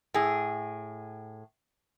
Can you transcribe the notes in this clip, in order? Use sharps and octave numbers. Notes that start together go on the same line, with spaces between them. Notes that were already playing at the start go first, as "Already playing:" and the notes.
A2 G#4